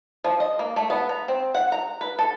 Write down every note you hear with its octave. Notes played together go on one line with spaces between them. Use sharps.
F3
D#5
A#3
A3
B3
A#5
C4
F#5
A#5
B4
A4